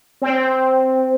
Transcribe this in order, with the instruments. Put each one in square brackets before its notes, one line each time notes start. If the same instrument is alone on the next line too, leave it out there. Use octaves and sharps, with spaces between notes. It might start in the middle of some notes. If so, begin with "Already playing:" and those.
[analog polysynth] C4